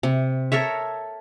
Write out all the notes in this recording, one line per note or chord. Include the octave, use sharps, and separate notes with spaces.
C3
A4 A#4 C#5 E5